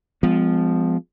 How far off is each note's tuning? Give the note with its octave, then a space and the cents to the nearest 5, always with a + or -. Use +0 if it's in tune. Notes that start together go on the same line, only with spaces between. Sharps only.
F3 +0 G#3 -20 B3 +45